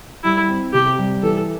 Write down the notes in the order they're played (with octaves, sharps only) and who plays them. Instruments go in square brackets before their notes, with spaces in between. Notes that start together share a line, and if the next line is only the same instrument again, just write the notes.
[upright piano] G3 [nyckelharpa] E4
[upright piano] C4
[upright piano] C3 [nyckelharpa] G4
[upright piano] G3
[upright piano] E3 [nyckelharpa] A4